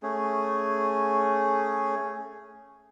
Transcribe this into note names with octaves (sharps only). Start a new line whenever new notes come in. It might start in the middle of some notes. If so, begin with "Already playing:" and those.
A3 C#4 G#4